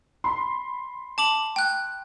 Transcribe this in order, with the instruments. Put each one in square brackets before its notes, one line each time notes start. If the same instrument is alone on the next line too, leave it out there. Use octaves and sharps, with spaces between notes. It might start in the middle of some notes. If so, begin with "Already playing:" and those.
[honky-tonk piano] B5 C6
[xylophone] A5 D6 F#7
G5 F#6